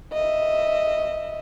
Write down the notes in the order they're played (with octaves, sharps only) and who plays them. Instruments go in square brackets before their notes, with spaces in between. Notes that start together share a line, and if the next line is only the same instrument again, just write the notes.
[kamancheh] D#5 E5